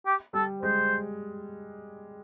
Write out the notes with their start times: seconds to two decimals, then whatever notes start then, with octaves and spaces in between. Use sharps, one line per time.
0.06 G4
0.33 G3 A4
0.62 G#3 C5